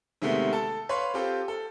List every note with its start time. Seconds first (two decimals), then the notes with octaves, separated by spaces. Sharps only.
0.22 C3 D#3 G#3 A3 B3
0.53 A4 A5
0.89 B4 C#5 F5 B5 C6
1.14 C4 F4 G4 A4
1.48 A4